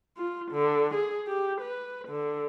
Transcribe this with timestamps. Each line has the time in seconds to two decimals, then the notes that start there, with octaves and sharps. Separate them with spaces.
0.17 F4
0.51 D3
0.95 G#4
1.28 G4
1.62 B4
2.08 D3